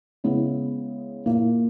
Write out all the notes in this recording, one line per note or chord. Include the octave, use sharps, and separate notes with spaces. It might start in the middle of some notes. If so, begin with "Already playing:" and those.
C#3 G#3 B3 E4
A#2 A#3 E4